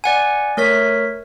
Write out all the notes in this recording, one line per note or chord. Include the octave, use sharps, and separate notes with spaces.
D5 F#5 G#5
A3 A#4 C#5 B6